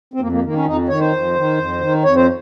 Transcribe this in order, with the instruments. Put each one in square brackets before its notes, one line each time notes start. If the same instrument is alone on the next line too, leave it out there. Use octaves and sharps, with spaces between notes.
[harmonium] C4
F2 A#3
A#3
D#3 A#3
C#4
F2 D#4
D#3 C#5
C5
F2
D#3
F2
D#3
F2 C#5
C5